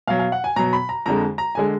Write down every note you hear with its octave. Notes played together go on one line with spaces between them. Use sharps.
B2 F#3 F5
F5
F#5
G#5
B2 F#3 A#5
B5
A#5
F2 D3 G#3 A#5
A#5
D3 G#3 G#5